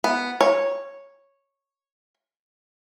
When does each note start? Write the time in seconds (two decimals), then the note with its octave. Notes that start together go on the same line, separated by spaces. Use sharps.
0.04 B3
0.41 C#5